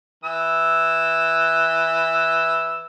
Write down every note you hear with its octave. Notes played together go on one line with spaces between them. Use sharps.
E3 E6